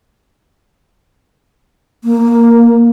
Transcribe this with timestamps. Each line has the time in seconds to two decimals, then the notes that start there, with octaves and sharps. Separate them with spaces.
2.04 A#3